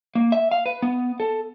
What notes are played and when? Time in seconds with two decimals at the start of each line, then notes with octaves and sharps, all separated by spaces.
0.15 A#3
0.32 E5
0.51 F5
0.66 B4
0.82 B3
1.20 A4